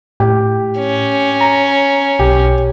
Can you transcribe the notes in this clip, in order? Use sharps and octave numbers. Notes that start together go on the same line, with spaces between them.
A2 G4
C#4
A#5
B1 G4